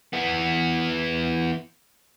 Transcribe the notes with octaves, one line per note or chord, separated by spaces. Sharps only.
E3 B3